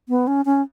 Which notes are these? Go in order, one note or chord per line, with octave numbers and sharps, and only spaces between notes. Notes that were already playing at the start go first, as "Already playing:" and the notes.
B3
C#4
C#4